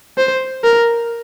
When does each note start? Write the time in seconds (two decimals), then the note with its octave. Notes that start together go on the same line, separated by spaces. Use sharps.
0.17 C5
0.64 A#4